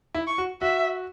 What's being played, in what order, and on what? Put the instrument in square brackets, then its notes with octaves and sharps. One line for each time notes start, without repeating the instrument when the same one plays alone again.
[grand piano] E4
[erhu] C#6
[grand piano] F#4
[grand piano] F#4 [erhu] E5